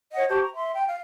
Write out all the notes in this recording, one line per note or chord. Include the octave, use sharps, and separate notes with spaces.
C#5 D#5 F#5
G4 C5 A5 C#6
A#5
E5 C6
G5
F5